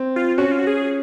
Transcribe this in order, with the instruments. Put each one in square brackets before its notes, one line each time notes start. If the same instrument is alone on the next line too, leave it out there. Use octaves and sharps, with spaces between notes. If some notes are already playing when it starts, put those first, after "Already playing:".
Already playing: [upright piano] C4
[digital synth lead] F4
[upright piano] C#4 [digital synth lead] F#4
[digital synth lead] F4
F#4
G#4